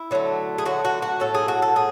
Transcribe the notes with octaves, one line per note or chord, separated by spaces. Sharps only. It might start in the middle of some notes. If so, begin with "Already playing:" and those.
Already playing: E4
D3 F#3 A3
G#4
D3 F#3 A3 F#4
F#4
F#4
A2 F#3 A3 A4
G#4
F#4
A4
A2 G#4